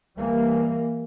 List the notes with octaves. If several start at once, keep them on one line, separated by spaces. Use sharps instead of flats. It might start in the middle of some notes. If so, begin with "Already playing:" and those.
E3 G3 A#3